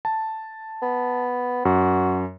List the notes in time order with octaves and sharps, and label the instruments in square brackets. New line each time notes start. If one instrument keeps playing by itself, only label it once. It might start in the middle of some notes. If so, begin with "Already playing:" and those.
[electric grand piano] A5
[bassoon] B3
[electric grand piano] F#2 [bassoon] F#4